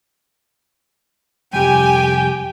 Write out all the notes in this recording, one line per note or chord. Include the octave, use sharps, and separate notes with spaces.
F2 C3 G3 G4 G5 G#5